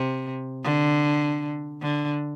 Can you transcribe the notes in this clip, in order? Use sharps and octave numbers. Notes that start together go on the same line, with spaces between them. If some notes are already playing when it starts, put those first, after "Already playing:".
Already playing: C3
D3
D3